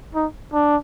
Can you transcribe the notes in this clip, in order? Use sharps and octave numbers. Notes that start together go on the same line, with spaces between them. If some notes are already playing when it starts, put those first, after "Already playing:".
D#4
D4